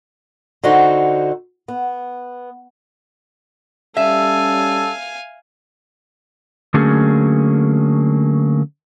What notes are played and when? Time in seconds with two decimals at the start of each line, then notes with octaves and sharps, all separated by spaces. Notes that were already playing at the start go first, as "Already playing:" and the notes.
0.64 D3 D#4 F#4 C5
1.68 B3
3.97 G3 C#4 A4 E5 F5 G#5
6.74 D3 F#3 A3 A#3 C#4 G#4